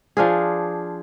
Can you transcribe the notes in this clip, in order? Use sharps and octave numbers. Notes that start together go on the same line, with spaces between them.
F3 D4 F4 G#4